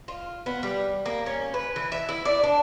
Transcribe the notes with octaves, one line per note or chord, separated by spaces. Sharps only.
F4
B3
G3
A#3
C#4
B4
E3
E5
E4
D5
D4